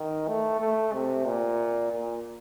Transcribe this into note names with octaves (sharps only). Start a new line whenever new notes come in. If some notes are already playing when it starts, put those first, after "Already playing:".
Already playing: D#3
A3
A3
C3
A#2
A#2